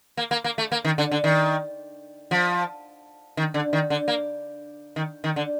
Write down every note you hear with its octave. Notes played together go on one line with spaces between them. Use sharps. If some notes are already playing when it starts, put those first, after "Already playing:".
A#3
A#3
A#3
A3
A#3
D#3
D3
D3
D#3
F3
D#3
D3
D#3
D3
A#3
D#3
D#3
D3